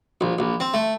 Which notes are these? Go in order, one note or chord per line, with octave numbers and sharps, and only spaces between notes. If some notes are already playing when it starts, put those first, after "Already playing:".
A#1
A#1
C4
A3